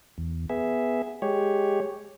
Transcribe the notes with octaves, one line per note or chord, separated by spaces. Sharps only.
E2
B3 G#4 E5
G#3 G4 C#5